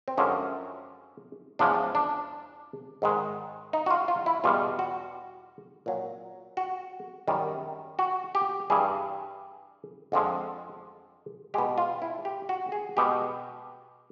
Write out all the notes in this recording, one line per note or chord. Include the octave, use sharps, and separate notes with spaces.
C4
F#2 D3 F3 G#3 C#4
E2 C#3 F3 G#3 D4
D4
G#2 D#3 G#3
D#4
F#4
F4
F4
E4
E2 B2 G3 F4
F#4
A#2 F#3
F#4
F#2 D#3 G3
F#4
G4
G2 E3 G3 G#4
F2 D3 F3 G#3
B2 G#3 G4
F4
E4
G4
F#4
G#4
B2 G#3 G4